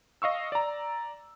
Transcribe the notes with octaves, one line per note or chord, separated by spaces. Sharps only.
D#5 F5 C#6 E6
D5 A#5